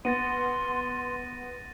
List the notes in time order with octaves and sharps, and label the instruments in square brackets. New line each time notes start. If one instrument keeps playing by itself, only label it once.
[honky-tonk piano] B3 [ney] C6 [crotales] A6 A#6 D#7